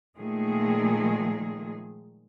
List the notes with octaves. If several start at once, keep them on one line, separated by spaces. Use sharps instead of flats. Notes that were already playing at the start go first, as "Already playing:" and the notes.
A#2 D#3 F3 G#3 A3 G#4